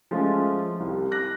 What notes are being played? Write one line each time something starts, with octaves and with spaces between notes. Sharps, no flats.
F3 G#3 A3 C#4 F4
C2
D6 F#6 A#6